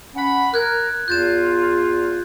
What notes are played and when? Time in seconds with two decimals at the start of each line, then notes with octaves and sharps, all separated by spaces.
0.15 C#4 F#5 B5
0.54 A#4 F#6 G#6
1.08 E2 F4 G6 A6 E7